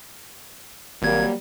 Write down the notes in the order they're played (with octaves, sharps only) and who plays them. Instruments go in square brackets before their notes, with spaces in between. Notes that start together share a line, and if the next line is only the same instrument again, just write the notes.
[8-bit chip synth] G#1 G#6 [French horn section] F#3 G3 A#3